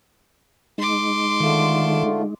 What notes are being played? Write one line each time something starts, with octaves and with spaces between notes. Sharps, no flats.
G#3 D#4 C6 D6
D3 D#3 A3 F4